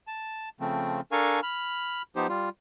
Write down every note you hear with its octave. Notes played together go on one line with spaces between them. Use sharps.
A5
C#3 F3 A3 C4
D4 A4 A#4 F5 G#5 C#6
B5 F6
F3 B3 D#4 G4 C5
G3 F4